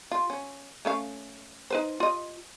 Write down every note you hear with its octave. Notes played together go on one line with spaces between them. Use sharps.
F4
C#4
A3 C#4 F5
D#4 B4 C5
F4 D#5